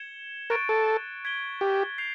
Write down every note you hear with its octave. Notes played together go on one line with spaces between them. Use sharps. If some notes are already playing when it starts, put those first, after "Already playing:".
Already playing: G#6 C#7 E7 G7
A#4 C#6 F#6 A6 D7
A4
G#6 B6 D7 G7
G4
G6 C7 F7